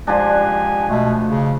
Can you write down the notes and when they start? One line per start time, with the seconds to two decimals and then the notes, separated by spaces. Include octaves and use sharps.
0.07 F3 G#3 D4 G4 G#5
0.90 B2 A3
1.28 C#3